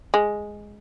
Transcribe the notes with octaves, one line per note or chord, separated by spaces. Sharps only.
G#3